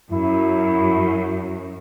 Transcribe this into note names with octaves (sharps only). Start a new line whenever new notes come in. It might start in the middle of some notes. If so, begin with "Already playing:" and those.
F#2 E4